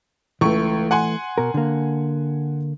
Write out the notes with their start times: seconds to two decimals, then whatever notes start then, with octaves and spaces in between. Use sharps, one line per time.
0.41 C#2 E3 A3 C#6
0.91 F#5 G#5 C6
1.38 B2 A#4
1.54 D3 A#3